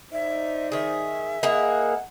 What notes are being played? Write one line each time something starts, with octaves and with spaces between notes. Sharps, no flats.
D#4 C5 D5 E5
D#3 G#4 E5
A#3 E4 G#4 D#5 F#5